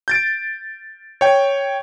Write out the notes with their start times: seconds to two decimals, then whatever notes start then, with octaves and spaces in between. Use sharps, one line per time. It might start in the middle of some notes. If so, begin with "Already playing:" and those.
0.08 G6 A6 D7
1.21 C#5 G5